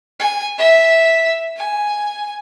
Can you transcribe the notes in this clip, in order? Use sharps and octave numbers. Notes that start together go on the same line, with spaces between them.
G#5
E5
G#5